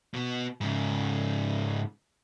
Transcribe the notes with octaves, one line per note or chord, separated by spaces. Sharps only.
B2 B3
G#2 C#3